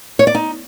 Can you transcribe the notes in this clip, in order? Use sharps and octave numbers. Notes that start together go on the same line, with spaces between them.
C#5
D5
D#4